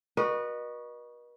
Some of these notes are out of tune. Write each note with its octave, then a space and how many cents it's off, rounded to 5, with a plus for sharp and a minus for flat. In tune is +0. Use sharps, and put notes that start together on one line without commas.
F#4 +0 B4 -45 D#5 -30